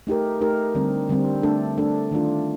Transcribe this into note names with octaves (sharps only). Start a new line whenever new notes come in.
A3 D#4 G4 A#4
A3 D#4 G4 A#4
D3 G3 C4
D3 G3 C4
A3 D4 A4
A3 D4 A4
D#3 A3 D4 F4